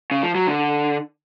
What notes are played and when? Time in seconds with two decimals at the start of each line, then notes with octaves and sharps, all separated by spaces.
0.11 C#3
0.23 F3
0.35 F#3
0.47 D3